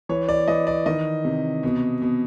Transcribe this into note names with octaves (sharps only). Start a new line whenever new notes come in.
E3 C#5
D5
E3 D#5
D5
D#3 D#5
C3
B2
B2